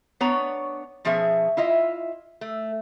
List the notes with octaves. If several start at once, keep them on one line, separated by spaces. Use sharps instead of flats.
B3 D4 C#5 A#5
B2 F3 C#4 G#4 E5
E4 F4 D#5 E5
A3